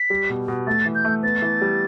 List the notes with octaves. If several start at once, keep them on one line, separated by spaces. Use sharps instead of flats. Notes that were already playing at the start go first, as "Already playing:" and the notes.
Already playing: B6
G3
B2
B2
A3 A6
E3
G6
A3
B3 A6
E3
G3